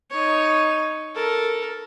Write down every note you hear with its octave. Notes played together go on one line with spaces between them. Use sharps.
D#4 C#5
A4 A#4